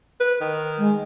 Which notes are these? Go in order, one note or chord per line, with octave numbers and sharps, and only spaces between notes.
B4
D#3
G#3